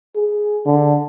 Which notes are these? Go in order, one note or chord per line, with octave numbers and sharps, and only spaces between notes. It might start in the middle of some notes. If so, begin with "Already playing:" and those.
G#4
D3